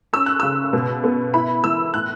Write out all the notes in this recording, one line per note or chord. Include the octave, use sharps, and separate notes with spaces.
C#4 E6
F#6
C#3 E6
B2
B3
E4 B5
E3 E6
A2 F#6